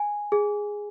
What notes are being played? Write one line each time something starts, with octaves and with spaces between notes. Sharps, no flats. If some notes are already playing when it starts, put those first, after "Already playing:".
Already playing: G#5
G#4